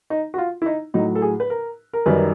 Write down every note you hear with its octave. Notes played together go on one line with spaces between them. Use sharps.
D#4
F#4
F4
E4
D#4
A2 F#3 D#4
A4
G#4
B4
A#4
A#4
F#2 D#3 G3 B4